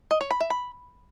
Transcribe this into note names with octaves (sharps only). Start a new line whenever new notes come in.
D#5
C#5
B5
E5
B5